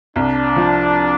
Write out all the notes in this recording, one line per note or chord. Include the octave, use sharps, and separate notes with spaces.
C2 D4
F3